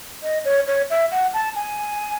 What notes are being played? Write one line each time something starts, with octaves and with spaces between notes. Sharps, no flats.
D#5
C#5
C#5
E5
F#5
A5
G#5